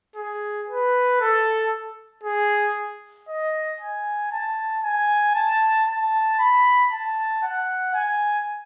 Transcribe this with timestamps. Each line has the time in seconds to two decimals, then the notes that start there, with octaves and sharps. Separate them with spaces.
0.16 G#4
0.69 B4
1.21 A4
2.23 G#4
3.28 D#5
3.80 G#5
4.32 A5
4.84 G#5
5.35 A5
5.88 A5
6.39 B5
6.92 A5
7.43 F#5
7.94 G#5